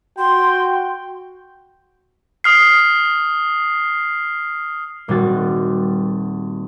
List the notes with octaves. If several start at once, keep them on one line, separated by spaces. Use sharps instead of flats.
F#4 G5 C6
D#6 F6 C7
D#1 G3 C4 F#4 A6